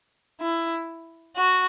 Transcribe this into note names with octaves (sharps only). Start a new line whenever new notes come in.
E4
F#4